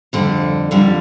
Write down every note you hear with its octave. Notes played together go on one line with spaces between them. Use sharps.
F2 D3 G3
F2 D3 G3